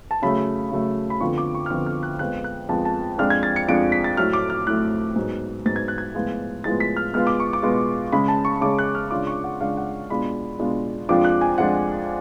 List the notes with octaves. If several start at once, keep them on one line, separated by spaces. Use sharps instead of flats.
A5
C#3 F#3 A3 B5
C#3 F#3 A3
B5
F2 D3 F3 B3 F4 C#6
D6
C#6
F6
F2 D3 F3 B3 F4 D6
F6
F#6
F2 F3 G#3 B3 F#6
F#6
F2 F3 G#3 B3 A5
A5
F2 F3 G#3 D4 F6
G#6
A6
C#7
F2 F3 G#3 D4 D7
B6
A6
A2 F#3 A3 F6
D6
F6
A2 F#3 A3 F#6
G#2 F#3 B3
G#2 F#3 B3 A6
G#6
F#6
G#6
A2 F3 G#3 B3 F4
A2 F3 G#3 B3 F4 A6
B6
F6
B2 G#3 B3 F4 F6
D6
C#6
D6
B2 G#3 B3 F4
C#3 G#3 C#4 B5
A5
C#6
C#3 G#3 C#4 D6
F#6
F6
C#3 G#3 D4 F4 D6
C#6
F#5
C#3 G#3 D4 F4 F5
F#5
B2 G#3 D4 F4 B5
B2 G#3 D4 F4
F2 F3 G#3 D4 F4 D6
F#6
G#5
F2 F3 G#3 D4 F4 F#5